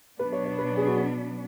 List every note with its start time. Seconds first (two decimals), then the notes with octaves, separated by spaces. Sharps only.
0.19 B2 F#3 B3 D4 B4
0.32 C#5
0.45 C#5
0.58 B4
0.77 G#4
0.87 F#4